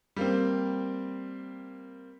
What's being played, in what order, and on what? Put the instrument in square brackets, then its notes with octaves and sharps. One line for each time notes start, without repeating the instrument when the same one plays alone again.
[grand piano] G3 A#3 C4